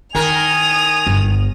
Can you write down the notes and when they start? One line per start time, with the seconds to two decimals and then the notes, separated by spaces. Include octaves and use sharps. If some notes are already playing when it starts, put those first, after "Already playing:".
0.15 D#3 E4 A#4 G#5 D#6 F7
1.07 G1